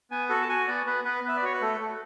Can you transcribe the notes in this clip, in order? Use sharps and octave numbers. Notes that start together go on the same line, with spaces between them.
B3 G#5
F#4 A4
A5
F#4 G#5
B3 D5
B3 B4
B3 B4
B3 E5
D5
F#4 C#5
B4
A3 A4
A3